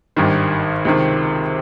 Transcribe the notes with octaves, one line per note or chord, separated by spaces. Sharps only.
G#1 G2 D#3 G3
C#2 C3 D#3